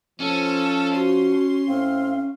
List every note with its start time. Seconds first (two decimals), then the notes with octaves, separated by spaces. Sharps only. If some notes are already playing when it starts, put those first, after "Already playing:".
0.20 F3 C#4 A4
0.96 F#4 C6
1.68 A2 C4 F5